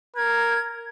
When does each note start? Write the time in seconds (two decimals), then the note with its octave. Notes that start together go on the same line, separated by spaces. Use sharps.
0.16 A#4 G#6